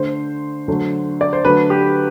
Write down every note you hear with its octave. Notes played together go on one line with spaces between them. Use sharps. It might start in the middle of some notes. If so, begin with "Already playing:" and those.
Already playing: D3 A3 C5
D3 F#3 A3
D5
C5
D3 F#3 A3 B4
G4